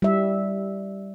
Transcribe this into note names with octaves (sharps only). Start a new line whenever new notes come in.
G3 E5